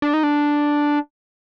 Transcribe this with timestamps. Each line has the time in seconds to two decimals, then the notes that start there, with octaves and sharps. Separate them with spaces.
0.02 D4
0.14 D#4
0.23 D4